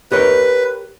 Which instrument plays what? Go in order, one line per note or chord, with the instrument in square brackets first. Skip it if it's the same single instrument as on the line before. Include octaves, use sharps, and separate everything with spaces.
[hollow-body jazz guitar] G4 A#4 C#5 [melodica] B4